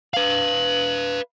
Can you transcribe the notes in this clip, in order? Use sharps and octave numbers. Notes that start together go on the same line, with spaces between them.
B4 F5 F#7